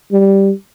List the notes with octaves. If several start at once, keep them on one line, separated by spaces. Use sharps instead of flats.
G3